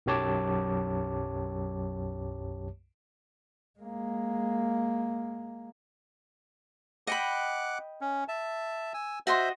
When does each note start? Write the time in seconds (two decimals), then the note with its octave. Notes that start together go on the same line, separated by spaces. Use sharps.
0.06 B1 F#2 G4 C#5 A5 D6
3.80 G#3 A#3
7.07 D#5 F#5 G5 B5 D6 F#6
8.01 C#4
8.28 E5 A5
8.94 G#5 E6
9.27 F#4 C5 D#5 E5 C6